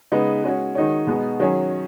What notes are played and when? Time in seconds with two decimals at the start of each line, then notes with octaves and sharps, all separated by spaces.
0.12 C#3 G#3 B3 D#4 B4
0.44 G#3 C#4 F#4 C#5
0.75 D#3 G#3 D#4 F#4 C#5
1.07 B2 G#3 B3 D#4
1.40 D#3 F#3 C#4 G#4 C#5